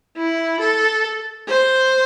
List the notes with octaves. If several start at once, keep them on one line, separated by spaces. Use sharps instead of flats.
E4
A4
C5